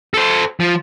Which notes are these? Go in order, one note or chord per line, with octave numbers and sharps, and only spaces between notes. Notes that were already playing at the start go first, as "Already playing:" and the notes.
A4 C5
F3